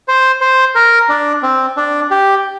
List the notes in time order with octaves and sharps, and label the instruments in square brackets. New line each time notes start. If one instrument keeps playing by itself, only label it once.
[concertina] C5
C5
A#4
D4
C4
D4
G4